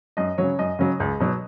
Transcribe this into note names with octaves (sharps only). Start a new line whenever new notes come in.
F#2 D#5
C#3 F#3 C#5
F#2 D#5
C#3 F#3
C#2
B2 F#3